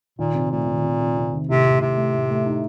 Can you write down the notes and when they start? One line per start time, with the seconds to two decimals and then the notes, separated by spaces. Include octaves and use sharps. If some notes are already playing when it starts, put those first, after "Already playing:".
0.19 A#2 D#3
0.34 C3
0.51 A#2 A3
0.67 D#3
0.84 C3
1.00 C3
1.17 C3
1.33 D#3
1.49 A2 C3
1.66 A2
1.81 A2 C3
1.97 A3
2.14 A2
2.31 A3
2.46 D#4